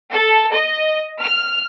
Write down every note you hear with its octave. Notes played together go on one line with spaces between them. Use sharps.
A4
D#5
F6